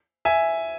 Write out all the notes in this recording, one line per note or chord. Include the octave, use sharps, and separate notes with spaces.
E5 G#5